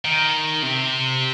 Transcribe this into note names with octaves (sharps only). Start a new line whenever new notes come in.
D#3
C3